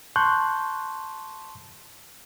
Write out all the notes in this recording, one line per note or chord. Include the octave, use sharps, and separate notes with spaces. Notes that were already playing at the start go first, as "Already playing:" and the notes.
A5 C6 C#6 F#6 G6